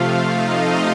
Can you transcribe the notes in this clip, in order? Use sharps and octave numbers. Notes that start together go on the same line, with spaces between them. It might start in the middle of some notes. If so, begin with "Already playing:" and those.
Already playing: C3 F3 A3 F4 F5
D#4 D#5